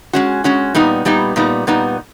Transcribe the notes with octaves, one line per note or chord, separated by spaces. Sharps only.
G#3 C#4 F#4
G#3 C#4 F#4
A#2 G3 B3 D#4
A#2 G3 B3 D#4
A#2 G3 B3 D#4
A#2 G3 B3 D#4